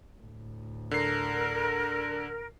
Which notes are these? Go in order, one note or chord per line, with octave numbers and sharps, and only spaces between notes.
D2 A2
D3 A#4 C7